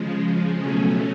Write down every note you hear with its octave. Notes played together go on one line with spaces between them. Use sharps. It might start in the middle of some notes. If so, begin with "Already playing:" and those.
Already playing: C#3 F3 G#3
B2 F#3 A3 C#4